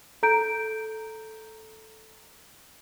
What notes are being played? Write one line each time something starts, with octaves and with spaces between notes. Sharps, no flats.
A4 A#5 G6 D7